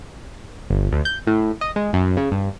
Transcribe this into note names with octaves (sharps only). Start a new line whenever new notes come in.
G1
D2
G6
A2
D#5
G#3
F#2
C#3
G2